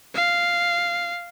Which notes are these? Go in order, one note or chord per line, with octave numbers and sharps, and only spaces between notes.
F5